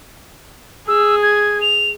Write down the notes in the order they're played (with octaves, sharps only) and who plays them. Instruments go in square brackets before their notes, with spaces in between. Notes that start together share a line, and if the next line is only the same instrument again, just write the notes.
[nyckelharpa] G#4 [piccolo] E6
[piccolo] G#6
F7